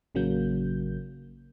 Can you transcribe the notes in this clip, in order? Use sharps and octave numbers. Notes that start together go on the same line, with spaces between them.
A1 C#3 F#3 A#3 G6